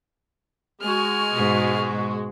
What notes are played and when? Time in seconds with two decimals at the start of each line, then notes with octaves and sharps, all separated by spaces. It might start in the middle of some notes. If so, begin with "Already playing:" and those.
0.82 G#3 F#4 G#5 F6
1.32 G#2 B2